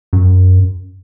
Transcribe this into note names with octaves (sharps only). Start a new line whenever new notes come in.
F#2